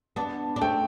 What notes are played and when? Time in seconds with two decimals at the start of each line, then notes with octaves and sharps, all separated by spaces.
0.16 B3 D4 A5
0.56 D4
0.61 A3 C4 G5